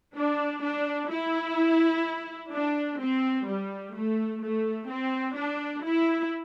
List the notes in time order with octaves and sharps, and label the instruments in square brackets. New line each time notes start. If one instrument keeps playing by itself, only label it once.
[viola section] D4
D4
E4
D4
C4
G3
A3
A3
C4
D4
E4